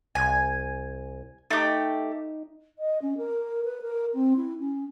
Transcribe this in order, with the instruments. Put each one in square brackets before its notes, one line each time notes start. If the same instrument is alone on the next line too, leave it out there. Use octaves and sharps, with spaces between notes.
[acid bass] C2 [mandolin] G#5
[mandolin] A3 G4 [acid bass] D#4
[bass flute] D#5
C#4
A#4
B4
A#4
C4
E4
C#4